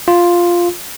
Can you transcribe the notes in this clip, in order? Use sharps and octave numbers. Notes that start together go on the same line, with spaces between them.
F4